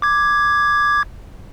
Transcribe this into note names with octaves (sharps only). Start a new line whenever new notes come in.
D6 G#6